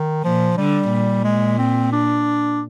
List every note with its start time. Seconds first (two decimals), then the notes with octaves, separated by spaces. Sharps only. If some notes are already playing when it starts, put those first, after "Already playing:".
Already playing: D#3
0.24 A#2 F3
0.57 D3 G3
0.92 A#2
1.24 G#3
1.58 C4
1.92 D4